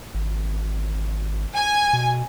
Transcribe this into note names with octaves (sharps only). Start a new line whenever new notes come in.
G#1
G#5
B2